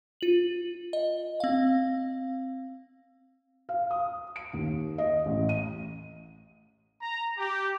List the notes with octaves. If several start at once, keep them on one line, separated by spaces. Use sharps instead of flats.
F4 F#7
D#5
C4 F5
F5
D#6
D7
D#2
D#5
A1
D#7
A#5
G4